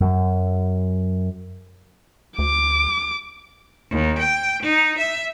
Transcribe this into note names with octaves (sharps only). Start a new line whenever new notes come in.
F#2 F#3
D2 D6
D#2
G5
D#4
E5